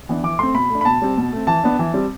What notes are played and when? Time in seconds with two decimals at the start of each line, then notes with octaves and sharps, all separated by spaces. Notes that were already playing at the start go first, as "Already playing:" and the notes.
0.09 E3 B3 D4
0.23 E3 D6
0.39 A3 C4 C6
0.55 B2 B5
0.70 A3 D4
0.81 B5
0.85 B2 A5
1.02 G3 C4
1.17 B2
1.32 A3 C4
1.47 E3 A5
1.64 B3 D4
1.79 E3
1.93 G3 C4